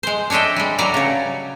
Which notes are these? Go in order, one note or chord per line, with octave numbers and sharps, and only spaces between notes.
G#3 C5
D4 C#5 D#5 E5 G5
G3 G#3
F#3 G3 D5 A#5
C#3 C#5